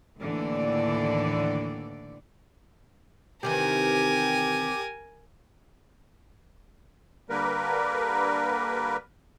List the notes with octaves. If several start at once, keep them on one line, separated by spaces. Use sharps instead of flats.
D#2 A2 D3 E3 D5
C3 D#3 E3 G4 A#4 G#5
D3 G3 A#3 A#4 B4